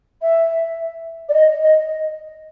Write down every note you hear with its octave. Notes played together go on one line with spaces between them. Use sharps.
E5
D5
D#5
D#5